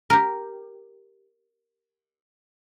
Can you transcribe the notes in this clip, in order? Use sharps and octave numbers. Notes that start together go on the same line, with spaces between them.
G4 A#4